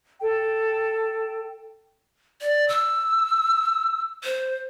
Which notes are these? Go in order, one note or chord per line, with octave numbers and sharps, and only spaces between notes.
A4 G5
D5
E6
C5